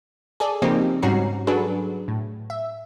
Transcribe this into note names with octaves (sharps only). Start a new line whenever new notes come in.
G#4 A4 D5
C#3 F3 A#3 C4 D#4 G4
G#2 G3 C#4 F#4 A#5 C7
F#3 D4 F#4 G#4 A4 B4
A2
E5